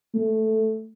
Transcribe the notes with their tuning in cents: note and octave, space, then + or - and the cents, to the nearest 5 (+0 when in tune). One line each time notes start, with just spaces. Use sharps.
A3 -5